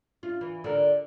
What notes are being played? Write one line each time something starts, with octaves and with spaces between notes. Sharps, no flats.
F4
E3
D3 A#4